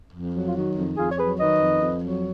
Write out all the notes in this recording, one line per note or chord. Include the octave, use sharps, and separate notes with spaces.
F2
F#3
F4
D#3 F#4
F2
F2 F4 G#4
C#5
F#3 G#4 B4
D#3 B4 D#5
F2
F2
F#3